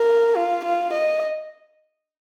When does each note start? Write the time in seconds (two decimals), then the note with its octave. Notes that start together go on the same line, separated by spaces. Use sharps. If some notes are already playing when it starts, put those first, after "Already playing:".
Already playing: A#4
0.36 F4
0.65 F4
0.93 D#5